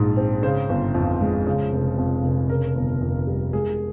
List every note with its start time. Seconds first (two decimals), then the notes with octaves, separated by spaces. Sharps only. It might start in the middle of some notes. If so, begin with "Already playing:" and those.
Already playing: A#1 G#2
0.17 C4
0.43 C#3 C5
0.69 G1
0.95 F2
1.21 G#3
1.47 C#3
1.72 F1
1.98 F2
2.24 F1
2.50 C#3 A#4
2.75 G1
3.01 F2
3.27 G3
3.53 G#3 G#4